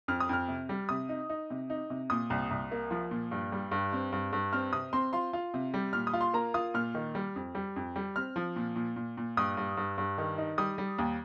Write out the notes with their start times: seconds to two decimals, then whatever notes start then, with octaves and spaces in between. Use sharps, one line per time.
0.08 F2 F6
0.20 D#6
0.29 F2 F6
0.48 C3
0.69 G3
0.89 C3 D#6
1.09 D#4
1.29 D#4
1.50 C3
1.70 D#4
1.90 C3
2.10 A#2 D#6
2.30 C2
2.51 C2
2.71 A#3
2.91 F3
3.11 A#2
3.31 G2
3.52 G3
3.72 G2
3.93 C4
4.12 G2
4.33 G2
4.53 C4 F6
4.72 C3 D#6
4.93 C4 C6
5.13 F4 C6
5.33 F4
5.54 C3
5.74 G3
5.93 A#2 F6
6.07 D#6
6.13 F4
6.21 C6
6.34 A#3 A#5
6.54 F4 D#6
6.74 A#2 F6
6.95 D#3
7.15 G3
7.36 F2
7.55 G3
7.76 F2
7.96 G3
8.16 C4 F6
8.36 F3
8.56 A#2
8.76 A#2
8.96 A#2
9.17 A#2
9.37 G2 D#6
9.57 G2
9.77 G2
9.98 G2
10.18 D#3
10.38 D#4
10.58 G3 D#6
10.78 G3
10.99 D#2